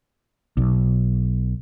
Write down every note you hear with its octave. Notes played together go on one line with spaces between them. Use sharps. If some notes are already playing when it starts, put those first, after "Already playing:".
B1